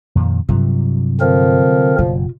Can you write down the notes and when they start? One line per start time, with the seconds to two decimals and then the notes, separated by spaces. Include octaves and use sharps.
0.15 F2 A#2 D#3
0.49 G2 C3 F#3 G3 F4
1.21 D3 F3 C4 A#4
1.98 F#1 B2 F4